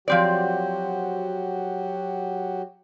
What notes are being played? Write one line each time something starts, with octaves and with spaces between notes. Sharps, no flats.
F3 F#3 C4 F#4 G4 D5